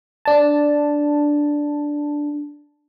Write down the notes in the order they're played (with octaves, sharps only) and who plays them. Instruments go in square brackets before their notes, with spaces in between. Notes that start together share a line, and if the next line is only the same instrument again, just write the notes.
[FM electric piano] D4 A5